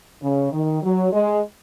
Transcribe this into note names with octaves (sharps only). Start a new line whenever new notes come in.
C#3
D#3
F#3
G#3